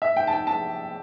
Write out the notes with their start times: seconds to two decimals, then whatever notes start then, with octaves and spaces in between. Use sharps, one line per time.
0.02 E5
0.17 G5
0.27 A5
0.33 G5
0.47 A5